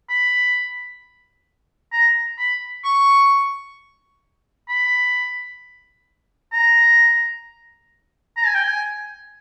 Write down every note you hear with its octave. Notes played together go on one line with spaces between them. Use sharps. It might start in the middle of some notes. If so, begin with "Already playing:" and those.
B5
A#5
B5
C#6
B5
A#5
A#5
G#5
G5
G#5